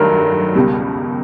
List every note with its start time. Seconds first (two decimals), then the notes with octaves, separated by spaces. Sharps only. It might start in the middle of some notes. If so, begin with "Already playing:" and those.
Already playing: G2 D#3 F#3 A3 A#4
0.55 C#2 B2 G3